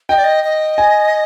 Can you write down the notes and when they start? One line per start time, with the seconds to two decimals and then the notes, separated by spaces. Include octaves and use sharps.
0.09 D#5 G5
0.17 D5
0.24 D#5
0.44 D#5
0.78 G#5